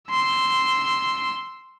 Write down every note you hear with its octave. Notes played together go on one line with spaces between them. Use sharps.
C6 E6